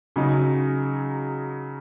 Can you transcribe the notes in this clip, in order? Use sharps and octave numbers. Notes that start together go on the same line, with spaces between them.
C#3 F#3 D#4